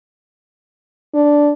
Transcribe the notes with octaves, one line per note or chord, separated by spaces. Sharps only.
D4